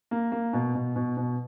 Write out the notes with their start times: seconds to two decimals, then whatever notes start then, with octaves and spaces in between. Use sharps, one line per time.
0.11 A#3
0.32 A#3
0.53 B2
0.75 B2
0.96 B2
1.17 B2